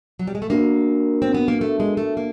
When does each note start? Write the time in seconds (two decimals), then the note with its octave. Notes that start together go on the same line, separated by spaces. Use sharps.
0.19 F#3
0.27 G3
0.35 G#3
0.42 A3
0.50 A#3 D4 F#4 A#4
1.22 C4
1.34 B3
1.48 A#3
1.61 A3
1.80 G#3
1.97 A3
2.17 A#3